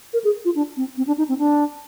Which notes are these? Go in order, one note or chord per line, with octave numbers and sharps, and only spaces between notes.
A#4
G#4
F4
D4
C4
C4
D4
D#4
C4
D4